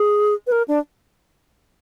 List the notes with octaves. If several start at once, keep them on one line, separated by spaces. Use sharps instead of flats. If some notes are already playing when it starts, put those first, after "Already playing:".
Already playing: G#4
B4
A#4
D4